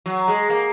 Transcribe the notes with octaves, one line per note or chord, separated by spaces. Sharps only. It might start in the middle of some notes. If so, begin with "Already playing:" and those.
F#3
G#3
A#3